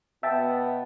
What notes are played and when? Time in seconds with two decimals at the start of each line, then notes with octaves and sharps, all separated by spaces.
0.23 B2 B3 E5 G5 A5